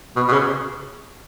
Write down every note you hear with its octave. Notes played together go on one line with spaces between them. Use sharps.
B2
B2
C#3